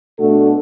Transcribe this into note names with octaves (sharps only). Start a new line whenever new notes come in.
B2 A3 D4 F#4 A4